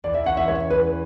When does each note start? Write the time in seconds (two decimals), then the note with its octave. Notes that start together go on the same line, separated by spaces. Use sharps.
0.04 E2 D5
0.14 E5
0.25 C#4 F#5
0.37 E5
0.48 G#3 C#5
0.70 E2 B4